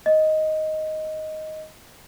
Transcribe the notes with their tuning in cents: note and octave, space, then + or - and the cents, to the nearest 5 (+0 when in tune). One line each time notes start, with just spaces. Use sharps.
D#5 +5